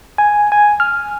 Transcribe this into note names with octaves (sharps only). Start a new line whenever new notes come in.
G#5
G#5
F6